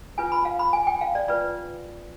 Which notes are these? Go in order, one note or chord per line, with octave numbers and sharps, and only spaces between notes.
D4 F4 B4 G#5
B5
F5
B5
G#5
G5
F5
D5
F4 B4 D5